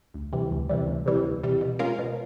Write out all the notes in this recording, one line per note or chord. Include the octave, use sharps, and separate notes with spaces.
D2
C3 E3 G3
D2
C3 E3 G3
D2
C3 E3 G3
D2
C3 E3 G3
B2
G#3 C#4 F4 A#4
B2